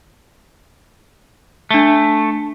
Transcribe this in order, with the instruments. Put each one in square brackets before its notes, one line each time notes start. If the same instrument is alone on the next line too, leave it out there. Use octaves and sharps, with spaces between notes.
[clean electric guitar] A3 [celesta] D4 G7